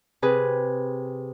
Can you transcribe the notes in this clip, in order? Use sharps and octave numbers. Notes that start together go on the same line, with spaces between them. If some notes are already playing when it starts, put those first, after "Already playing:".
C3 G#4 B4